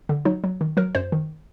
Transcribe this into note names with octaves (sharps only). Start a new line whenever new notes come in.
D3
F#3 D#4
F#3
D#3
F#3 A#4
F#2 C5
D#3